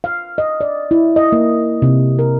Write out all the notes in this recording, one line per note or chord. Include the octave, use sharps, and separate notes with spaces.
F5
D#5
D5
E4
D#5
A#3
C3
A#4